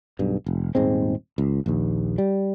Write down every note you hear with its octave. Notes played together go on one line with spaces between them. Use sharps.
B1 G2
F1
D#1 G#2 G#3 C4
C#2
A#1 D#2
G3